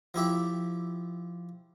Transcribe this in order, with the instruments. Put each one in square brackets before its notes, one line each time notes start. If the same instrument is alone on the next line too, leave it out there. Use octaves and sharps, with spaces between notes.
[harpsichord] F3 E4 G4 E5